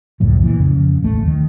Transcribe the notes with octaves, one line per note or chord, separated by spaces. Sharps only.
C#2 F#2 A2 F3
A#2 E3
F2 C#3
A1 D#2 A3
D#3